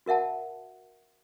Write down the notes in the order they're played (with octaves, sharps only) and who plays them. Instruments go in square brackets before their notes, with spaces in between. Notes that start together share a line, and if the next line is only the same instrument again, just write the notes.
[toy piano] F#4 A#4 E5 F#5 A5